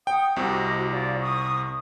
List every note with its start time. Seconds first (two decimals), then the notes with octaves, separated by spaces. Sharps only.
0.07 F#5 G5 D#6
0.36 C2 C3 F#4 D#5
0.91 F4 D5
1.20 C#6 D#6